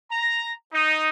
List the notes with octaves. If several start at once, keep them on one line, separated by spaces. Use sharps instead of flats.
A#5
D#4